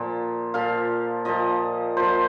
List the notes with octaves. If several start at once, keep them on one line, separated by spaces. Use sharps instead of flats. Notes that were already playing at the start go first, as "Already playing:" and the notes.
Already playing: A#2 F3
A#2 F3 F5
A#2 F3 D#5
A#2 F3 C5